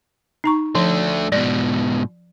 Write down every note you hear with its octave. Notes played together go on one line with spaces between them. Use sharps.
D#4 A#5 C#6
F3 A3 D4
G#2 B2 D5